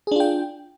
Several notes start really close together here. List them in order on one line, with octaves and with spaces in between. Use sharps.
G#4 D4 F4 G5